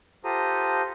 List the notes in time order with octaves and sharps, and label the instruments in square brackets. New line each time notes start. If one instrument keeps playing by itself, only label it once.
[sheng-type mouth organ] F4 G4 A4 C5 A#5 D#6